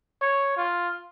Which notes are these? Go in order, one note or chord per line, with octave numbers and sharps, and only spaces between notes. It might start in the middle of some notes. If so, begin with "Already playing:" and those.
C#5
F4